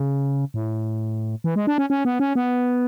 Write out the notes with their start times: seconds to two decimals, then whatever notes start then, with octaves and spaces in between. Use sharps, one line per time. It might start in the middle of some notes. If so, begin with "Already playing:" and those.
Already playing: C#3
0.54 A2
1.44 E3
1.56 G#3
1.67 D4
1.78 C#4
1.90 C#4
2.05 B3
2.20 C#4
2.35 B3